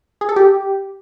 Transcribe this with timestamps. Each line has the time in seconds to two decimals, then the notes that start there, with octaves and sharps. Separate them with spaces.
0.21 G#4
0.29 A4
0.36 G4